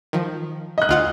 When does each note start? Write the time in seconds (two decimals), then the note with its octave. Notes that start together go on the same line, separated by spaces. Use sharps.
0.13 D#3 F3
0.78 D#5 F#6
0.89 D2 F4 F#5